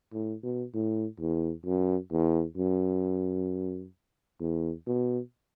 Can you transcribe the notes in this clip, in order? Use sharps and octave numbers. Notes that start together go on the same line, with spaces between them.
A2
B2
A2
E2
F#2
E2
F#2
E2
B2